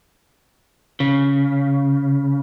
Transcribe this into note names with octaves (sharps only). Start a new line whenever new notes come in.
C#3